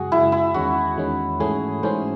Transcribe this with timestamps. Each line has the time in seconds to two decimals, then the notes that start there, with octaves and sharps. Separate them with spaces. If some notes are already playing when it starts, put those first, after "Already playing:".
Already playing: F#2 C#3 G#3 F#4 G#4
0.12 F#2 C#3 G#3 E4
0.32 E4
0.54 E2 D#3 G#3 C#4 F#4
0.97 E2 D#3 G#3 C#4
1.40 G#2 E3 A3 C#4 G#4
1.83 G#2 E3 A3 C#4 C5